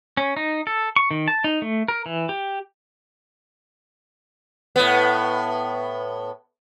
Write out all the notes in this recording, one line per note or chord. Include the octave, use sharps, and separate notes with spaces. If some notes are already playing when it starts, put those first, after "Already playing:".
C#4
D#4
A4
C#6
D#3
A5
D#4
A3
A#4
E3
G4
A2 B3